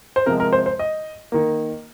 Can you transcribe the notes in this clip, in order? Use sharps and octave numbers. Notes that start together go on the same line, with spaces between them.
C5
C3 F3 G#3 A#4
A#4
C5
C5
D#5
D#3 A#3